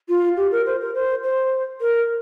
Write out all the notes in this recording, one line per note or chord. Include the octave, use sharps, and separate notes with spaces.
F4
G4
A#4
C5
A#4
C5
C5
A#4